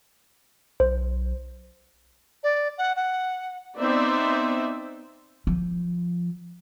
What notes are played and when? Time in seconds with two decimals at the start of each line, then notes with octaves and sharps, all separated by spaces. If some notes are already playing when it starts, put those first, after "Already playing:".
0.80 B1 C5
2.43 D5
2.78 F#5
2.96 F#5
3.78 B3 C4 D#4 C5 D5 E5
5.47 F3